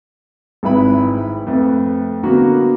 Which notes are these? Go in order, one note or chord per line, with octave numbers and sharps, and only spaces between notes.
G#1 G#2 E4 B4 B5
F2 A3 B4
D3 A#3 B3 F#4